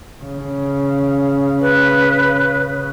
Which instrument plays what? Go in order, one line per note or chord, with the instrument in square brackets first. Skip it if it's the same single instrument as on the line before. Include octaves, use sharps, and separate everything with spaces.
[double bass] C#3
[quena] B4